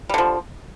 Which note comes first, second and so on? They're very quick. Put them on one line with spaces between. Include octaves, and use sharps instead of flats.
G3 D3 F3